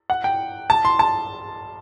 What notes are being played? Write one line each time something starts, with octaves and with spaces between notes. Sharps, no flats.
F#5
G5
A5
C6
A5